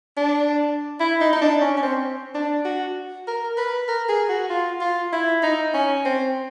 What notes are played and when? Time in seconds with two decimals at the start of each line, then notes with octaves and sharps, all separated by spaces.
0.17 D4
1.00 E4
1.21 D#4
1.33 D#4
1.41 D4
1.61 C#4
1.77 C#4
1.82 C4
2.34 D4
2.65 F#4
3.27 A#4
3.57 B4
3.88 A#4
4.08 G#4
4.29 F#4
4.50 F4
4.81 F4
5.12 E4
5.43 D#4
5.74 C#4
6.05 C4